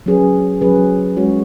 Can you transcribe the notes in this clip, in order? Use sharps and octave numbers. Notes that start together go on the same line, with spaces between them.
F#3 C#4 G#4 B4
F#3 C#4 G#4 B4
G#3 C#4 F#4 C#5